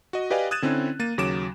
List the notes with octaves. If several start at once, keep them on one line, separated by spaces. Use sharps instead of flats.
F#4 D#5
G4 B4 D5 D#5 F5 G#5
D#6 F#6 G#6 A6 D#7 E7
D3 C4 C#4 E4
A#3 A6 D#7
D#2 C#3 F#3 D6 D7 E7